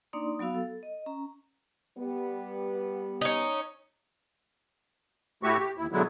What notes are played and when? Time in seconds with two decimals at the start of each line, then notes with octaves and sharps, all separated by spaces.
0.13 A#3 D4 D#4 D5 C6 D#6
0.39 F#3 B3 F#4 F5 E6
0.55 A4
0.83 D#5
1.06 C#4 A#5
1.98 G3 B3
3.21 C#4 D#4
5.43 A2 A3 E4 F#4 G4 C#6
5.59 G4
5.77 D#2 E4
5.92 B2 D3 F#3 G#3 B3 E4